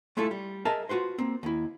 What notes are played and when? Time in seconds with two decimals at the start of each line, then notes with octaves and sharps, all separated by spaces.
0.17 G#3 A3 E4 F4 A4
0.31 G3
0.65 G#4 A#4 D#5 E5 A5
0.89 F4 F#4 B4 C5
1.18 A#3 C4
1.43 D#2 E4